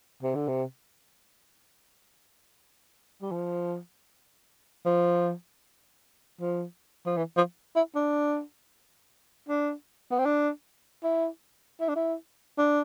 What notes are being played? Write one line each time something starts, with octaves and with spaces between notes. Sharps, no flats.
C3
D3
C3
G3
F3
F3
F3
F3
E3
F3
E4
D4
D4
B3
C4
D4
E4
E4
D4
E4
D4